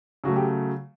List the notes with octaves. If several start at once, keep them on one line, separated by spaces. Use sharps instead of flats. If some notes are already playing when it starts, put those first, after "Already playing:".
C#3 F#3 A3 F#4
G4